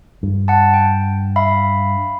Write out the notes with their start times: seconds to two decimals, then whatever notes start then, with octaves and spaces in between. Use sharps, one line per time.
0.23 G2
0.48 F#5 A5
0.74 G5
1.36 E5 F5 B5